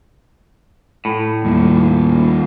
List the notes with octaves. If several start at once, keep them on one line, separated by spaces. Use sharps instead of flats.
A2
D#2 G3